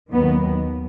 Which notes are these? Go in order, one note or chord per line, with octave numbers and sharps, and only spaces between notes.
D#2 D#3 F#3 B3